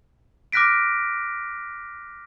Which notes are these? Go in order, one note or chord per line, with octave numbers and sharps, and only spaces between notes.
D6 F6 F#6 A#6 B6 D7